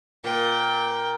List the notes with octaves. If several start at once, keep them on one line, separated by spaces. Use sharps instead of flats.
A#2 G5